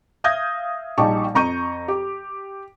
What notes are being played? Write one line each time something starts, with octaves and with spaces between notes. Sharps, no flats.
E5 F5 D#6 G6 G#6 A#6
A#1 G3 D#4 G4 A5 C#6
F2 A#5 C#6 G6 D#7
G4